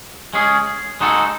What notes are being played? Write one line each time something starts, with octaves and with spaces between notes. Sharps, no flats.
G#3 C#4 G#4
G#3 D#4 F#4 A4